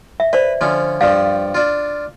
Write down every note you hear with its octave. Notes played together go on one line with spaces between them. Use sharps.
E5
B4 C5 D5
D3 F3 C#4
G2 F3 G3 F5
D4 F4